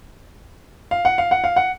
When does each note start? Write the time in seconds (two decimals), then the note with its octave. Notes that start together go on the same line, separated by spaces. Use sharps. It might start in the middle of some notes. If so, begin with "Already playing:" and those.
0.91 F5
1.05 F#5
1.18 F5
1.31 F#5
1.44 F5
1.56 F#5